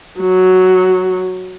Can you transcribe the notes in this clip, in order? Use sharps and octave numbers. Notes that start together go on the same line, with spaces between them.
F#3